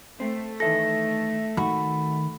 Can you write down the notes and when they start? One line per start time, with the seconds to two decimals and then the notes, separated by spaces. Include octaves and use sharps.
0.20 A3 C4
0.60 D#3 E3 A4 E5 A#6
1.57 D#3 F#4 B5